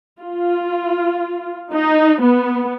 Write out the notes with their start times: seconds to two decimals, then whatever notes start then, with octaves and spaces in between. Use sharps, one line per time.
0.20 F4
1.72 D#4
2.22 B3